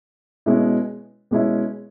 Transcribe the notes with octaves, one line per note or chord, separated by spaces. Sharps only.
B2 G#3 C#4 E4
B2 G#3 C#4 E4